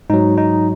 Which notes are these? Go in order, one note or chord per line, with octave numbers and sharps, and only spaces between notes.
G#2 F#3 D#4
D#4